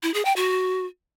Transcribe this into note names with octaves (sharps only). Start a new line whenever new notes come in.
E4
G#4
G5
F#4